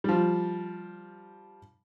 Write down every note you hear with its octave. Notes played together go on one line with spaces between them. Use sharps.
F3 G3